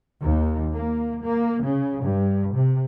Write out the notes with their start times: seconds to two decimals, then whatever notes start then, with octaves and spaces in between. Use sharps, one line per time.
0.21 D#2
0.72 A#3
1.22 A#3
1.62 C#3
2.04 G2
2.54 C3